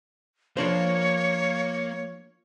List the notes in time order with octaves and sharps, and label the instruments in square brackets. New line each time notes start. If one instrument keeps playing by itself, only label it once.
[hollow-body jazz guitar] F3 D4 C5 [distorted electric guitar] A#3 [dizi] C#5